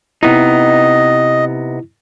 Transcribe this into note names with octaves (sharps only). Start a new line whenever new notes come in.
C3 B3 D#4 E4 D#5